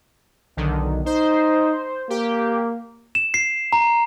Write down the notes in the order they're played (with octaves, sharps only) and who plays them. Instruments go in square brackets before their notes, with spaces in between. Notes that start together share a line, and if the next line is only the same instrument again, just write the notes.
[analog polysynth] B1 D3 D#3
[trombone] D#4 [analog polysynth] C5
[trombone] A#3 [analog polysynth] G4
[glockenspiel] E7
C7
A#5